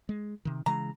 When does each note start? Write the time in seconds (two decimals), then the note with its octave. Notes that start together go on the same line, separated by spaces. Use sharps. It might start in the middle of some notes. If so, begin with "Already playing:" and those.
0.09 G#3
0.45 C3 D#3
0.66 C#3 E3 G#3 A#5